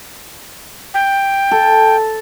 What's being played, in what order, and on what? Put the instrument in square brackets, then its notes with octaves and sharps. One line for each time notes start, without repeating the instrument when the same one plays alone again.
[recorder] G5
[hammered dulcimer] A4